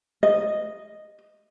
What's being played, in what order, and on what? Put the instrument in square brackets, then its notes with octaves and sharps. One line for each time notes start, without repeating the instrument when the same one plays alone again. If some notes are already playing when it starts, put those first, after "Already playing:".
[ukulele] D#5